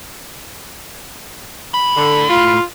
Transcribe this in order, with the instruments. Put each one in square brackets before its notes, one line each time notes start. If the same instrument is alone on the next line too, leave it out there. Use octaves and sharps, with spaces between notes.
[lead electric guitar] A2 B5
[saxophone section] D3
F4